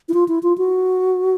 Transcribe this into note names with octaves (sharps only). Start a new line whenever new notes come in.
E4
F4
E4
F4
F#4